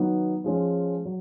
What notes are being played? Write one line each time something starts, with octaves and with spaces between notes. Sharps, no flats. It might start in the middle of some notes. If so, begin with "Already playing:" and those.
Already playing: D#3 F#3 B3 D#4
F3 G#3 C#4
F#3